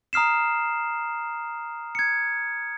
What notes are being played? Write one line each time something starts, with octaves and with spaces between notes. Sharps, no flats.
A#5 D#6 F6 C7 E7
G#6 C#7